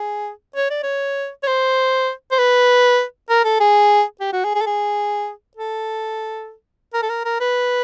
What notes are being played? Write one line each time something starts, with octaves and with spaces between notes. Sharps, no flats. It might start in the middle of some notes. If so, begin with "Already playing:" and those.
Already playing: G#4
C#5
D5
C#5
C#5
C5
C5
B4
A#4
A4
G#4
G4
F#4
G#4
G#4
A4
G#4
A4
A#4
A4
A#4
A#4
B4